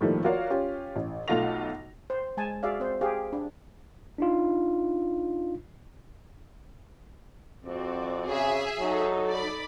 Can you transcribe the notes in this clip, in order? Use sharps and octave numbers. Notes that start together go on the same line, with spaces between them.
A2 D#3 F3 G3 A3 A#3
F4 F#4 A#4 C#5 D5 F5
C#4 F4 G4
A1
B1 A3 F4 F#5 A#6 F7
C5
G#3 G#5 A5
F#4 G#4 D5 E5 F5
C4 C5
G4 G#4 C5 F5
D4
D4 D#4 F4
F2 C4 F#4 D5
C#3 G#4 E5
F#3 D#4 A4
D5 B5